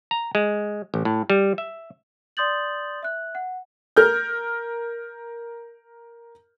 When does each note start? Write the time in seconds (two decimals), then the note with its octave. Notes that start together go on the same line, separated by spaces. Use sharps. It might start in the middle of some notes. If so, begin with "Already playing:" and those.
0.11 A#5
0.35 G#3
0.94 A1
1.05 A2
1.30 G3
1.58 E5
2.37 D5 C6 D#6 G6 A6 F#7
3.03 E5 F#6
3.35 F#5
3.97 A#4 F6 G6